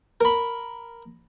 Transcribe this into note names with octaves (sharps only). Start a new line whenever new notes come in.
A#4 B5